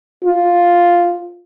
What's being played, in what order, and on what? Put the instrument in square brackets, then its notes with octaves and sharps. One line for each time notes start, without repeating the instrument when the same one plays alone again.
[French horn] F4